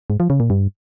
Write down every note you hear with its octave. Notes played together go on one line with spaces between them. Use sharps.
G#2
F3
C#3
A#2
G2